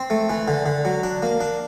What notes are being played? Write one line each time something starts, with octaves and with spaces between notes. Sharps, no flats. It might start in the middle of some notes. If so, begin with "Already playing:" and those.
Already playing: C4
A3
E3
D3
D3
F#3
D4
A#3
D4